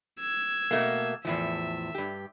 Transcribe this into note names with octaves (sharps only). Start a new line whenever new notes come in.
E6 G#6
B2 A3 A#3
E2 A2 F3 E5
G2 G4